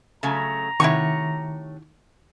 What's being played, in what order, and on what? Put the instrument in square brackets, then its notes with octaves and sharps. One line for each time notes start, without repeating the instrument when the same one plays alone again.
[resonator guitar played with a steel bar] C#3 F#3 A3 [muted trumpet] A#5
[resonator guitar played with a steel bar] C3 A3 C#5 [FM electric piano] D#3 [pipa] E4 F#4 C#6